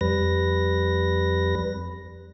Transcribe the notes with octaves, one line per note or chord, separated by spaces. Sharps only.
F2 G3 B4 A#6